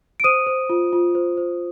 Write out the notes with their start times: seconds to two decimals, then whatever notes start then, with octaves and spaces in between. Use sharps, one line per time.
0.20 D7
0.24 C5 D#6 D#7
0.47 C5
0.70 F4
0.93 F4
1.15 C5
1.37 C5